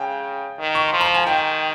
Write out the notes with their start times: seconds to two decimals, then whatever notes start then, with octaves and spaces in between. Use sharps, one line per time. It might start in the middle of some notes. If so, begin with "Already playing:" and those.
Already playing: C#3 G5 G#5
0.59 D#3
0.75 C#6
0.88 C6
0.93 F3
1.01 A#5
1.14 G#5
1.27 D#3 G5